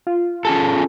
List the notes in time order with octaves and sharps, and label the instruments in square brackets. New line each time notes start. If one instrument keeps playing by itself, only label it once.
[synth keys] F4
[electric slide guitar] C#4 G#4 A4